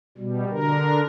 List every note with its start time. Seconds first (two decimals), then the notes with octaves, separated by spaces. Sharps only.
0.18 B2 G3
0.49 D3 A#4